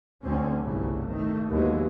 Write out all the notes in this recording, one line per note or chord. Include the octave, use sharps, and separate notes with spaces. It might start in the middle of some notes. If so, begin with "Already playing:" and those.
D2 D3 C4 C#4
G1 C2 A2 C#3 F#3
D#3 A3
G1 D#2 E3 F#3 G#3 B3